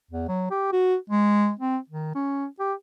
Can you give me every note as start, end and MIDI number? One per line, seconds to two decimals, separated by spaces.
0.11 0.28 40
0.28 0.49 54
0.51 0.68 67
0.72 0.96 66
1.10 1.52 56
1.59 1.78 60
1.90 2.12 51
2.15 2.46 61
2.60 2.73 67